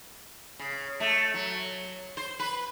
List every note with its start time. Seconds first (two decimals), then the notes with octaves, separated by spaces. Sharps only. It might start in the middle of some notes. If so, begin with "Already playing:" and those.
0.60 C#3
1.00 A3
1.34 F#3
2.17 C5
2.39 B4